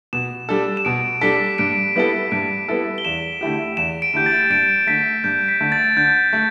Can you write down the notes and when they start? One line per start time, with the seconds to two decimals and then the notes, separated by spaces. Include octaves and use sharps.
0.13 B2 E7
0.49 G3 D4 A4
0.77 E7
0.85 B2 D7
1.21 G3 D4 A4 B6
1.58 G2 D7
1.96 G3 B3 E4 A4
2.31 G2 D7
2.68 G3 B3 E4 A4
2.98 G7
3.05 E2 E7
3.41 D3 A3 E4 G4
3.77 E2 E7
4.02 D7
4.14 D3 A3 E4 G4 G6
4.26 A6
4.50 G2 D7
4.87 D3 A3 B6
5.24 G2 G6
5.48 B6
5.60 D3 A3
5.72 A6
5.97 D3 G6
6.33 A3